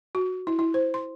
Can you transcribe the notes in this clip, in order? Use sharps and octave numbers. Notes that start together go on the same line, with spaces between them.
F#4
E4
E4
C5
C6